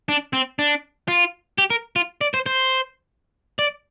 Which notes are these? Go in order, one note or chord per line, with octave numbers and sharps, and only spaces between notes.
D4
C4
D4
F4
G4
A#4
F4
D5
C5
C5
D5